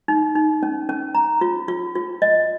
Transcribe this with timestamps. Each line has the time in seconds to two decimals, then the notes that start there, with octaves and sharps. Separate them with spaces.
0.08 D#4
0.35 D#4
0.63 C#4
0.89 C#4
1.15 A#5
1.41 F4
1.68 F4
1.95 F4
2.22 D#5